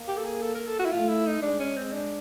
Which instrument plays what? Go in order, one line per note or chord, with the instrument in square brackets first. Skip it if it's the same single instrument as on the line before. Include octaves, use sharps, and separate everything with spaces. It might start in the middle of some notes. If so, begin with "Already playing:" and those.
Already playing: [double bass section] A#3
[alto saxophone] G4
A4
G#4
A4
A#4
A4
F#4
E4
[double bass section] A3 [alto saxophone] F4
[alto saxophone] E4
D#4
[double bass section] G#3 [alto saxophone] D4
[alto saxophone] C#4
C4
D4